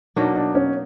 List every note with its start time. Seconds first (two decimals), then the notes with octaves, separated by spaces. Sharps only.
0.16 B2 F#3 A#3 D4 D#4
0.36 D4
0.55 C#4